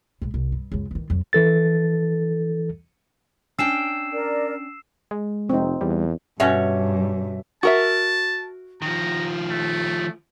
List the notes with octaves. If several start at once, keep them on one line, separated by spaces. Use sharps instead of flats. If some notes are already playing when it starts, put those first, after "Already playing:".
A#1 G#3
C2
G2
C#2 F#2
D#3 E3
F2 F#3
E3 A4 A6
C#4 D4 G5 E6 C7 E7
A#4 D5
G#3
F1 C4 D#4
E2 G3
G2 B2 C#4 C#5 E5
F#4 A#4 E5 A5
D#3 F3 A#5
A3